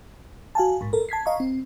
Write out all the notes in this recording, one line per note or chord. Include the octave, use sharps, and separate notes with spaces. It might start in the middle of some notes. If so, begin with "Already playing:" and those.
F#4 F5 G#5 A5
A#1 G#2
A4 A#4
A5 G#6 B6 C7
D#5 F5 A#5 C#6
C4